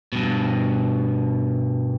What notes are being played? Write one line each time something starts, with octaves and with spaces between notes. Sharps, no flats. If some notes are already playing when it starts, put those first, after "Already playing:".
G2 B2